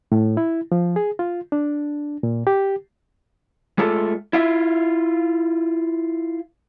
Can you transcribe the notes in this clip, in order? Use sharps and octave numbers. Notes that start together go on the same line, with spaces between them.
A2
E4
F3
G#4
F4
D4
A#2
G4
G#3 A3 F4 A4
E4 F4 E5